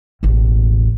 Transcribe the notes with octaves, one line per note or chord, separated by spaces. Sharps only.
E1 A1